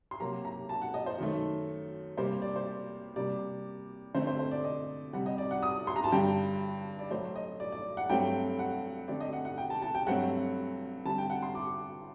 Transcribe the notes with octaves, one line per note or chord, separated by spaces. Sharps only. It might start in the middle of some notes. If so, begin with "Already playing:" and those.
C6
C3 F#3 A#3 A#5
A#5
A5
F#5
D#5
C5
F#2 D#3 A3
C3 G3 A#3 C5
D5
C5
D5
C3 G3 A#3 D5
D3 A3 C4 C5
C5
C5
D5
D#5
C3 G3 C4 F#5
D#5
D5
F#5
D#6
C6
A#5
A5
G2 D3 G3 G5
D5
A2 F#3 A3 C5
D#5
D5
D5
F#5
G2 F#3 A3 C4 G5
F#5
D3 A3 C4 D5
D#5
F#5
F#5
G5
A5
A5
G5
G2 F#3 A3 C4 F#5
D3 G3 C4 A5
G5
F#5
C6
D6